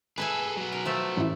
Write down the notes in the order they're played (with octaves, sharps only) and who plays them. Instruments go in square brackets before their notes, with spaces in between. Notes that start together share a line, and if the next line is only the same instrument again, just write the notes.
[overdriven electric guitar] G#4 A4 [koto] B4 E5 G#5
[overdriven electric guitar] F#3 B3
[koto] A#4
F3 A3 E5
[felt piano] A1 E4